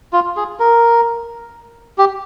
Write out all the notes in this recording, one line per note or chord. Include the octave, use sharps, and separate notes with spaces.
F4
G#4
A#4
G4